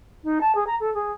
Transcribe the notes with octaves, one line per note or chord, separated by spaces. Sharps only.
D#4
A5
G#4
A#5
A4
G#4